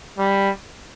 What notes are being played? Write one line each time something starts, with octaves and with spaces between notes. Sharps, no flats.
G3